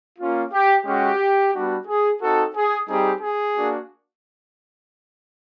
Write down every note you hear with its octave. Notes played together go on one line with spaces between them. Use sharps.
A#3 C#4 F4
G4
G#3 C#4 F#4 G4
G3 B3 D4 F#4
G#4
C4 D#4 F#4 A4
G#4
G3 C4 D#4 G4 G#4
G#4
A#3 D4 F#4